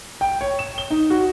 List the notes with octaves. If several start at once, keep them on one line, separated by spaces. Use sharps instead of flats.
G5
C#5
E7
G7
D#4
F#4